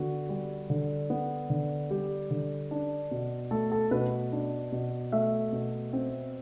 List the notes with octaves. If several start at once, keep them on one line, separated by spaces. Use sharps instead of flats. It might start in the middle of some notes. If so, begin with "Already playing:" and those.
Already playing: D3 B3 F#4
G3
D3
B3
D3
G3 G4
D3
D4
B2
A3 A4
A4
B2 B4
D4
B2
A3 E5
B2
C4